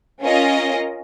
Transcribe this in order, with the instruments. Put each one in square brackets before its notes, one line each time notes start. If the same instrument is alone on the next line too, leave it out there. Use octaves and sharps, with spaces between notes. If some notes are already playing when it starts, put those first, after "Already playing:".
[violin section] C#4 F4 A#4 D#5